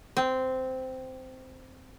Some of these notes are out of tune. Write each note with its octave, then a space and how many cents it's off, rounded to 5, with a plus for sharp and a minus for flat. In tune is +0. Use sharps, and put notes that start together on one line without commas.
C4 -10